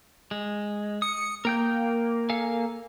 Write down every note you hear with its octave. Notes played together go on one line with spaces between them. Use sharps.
G#3
D#6 C#7
A#3 A#4 G5 G6
A4 F5 G#5